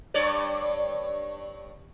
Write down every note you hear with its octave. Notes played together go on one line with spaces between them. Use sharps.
G2 C#5 D5